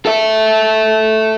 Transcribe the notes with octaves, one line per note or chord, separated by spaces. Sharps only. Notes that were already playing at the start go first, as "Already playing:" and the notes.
A4 E5